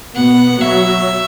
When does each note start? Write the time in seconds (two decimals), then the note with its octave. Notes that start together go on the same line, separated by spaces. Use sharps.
0.16 B2 B3 F#5
0.61 F#3 E5